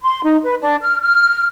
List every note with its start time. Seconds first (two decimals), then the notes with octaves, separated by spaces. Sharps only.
0.03 C6
0.24 D#4
0.44 B4
0.61 D4
0.81 F6
1.01 F6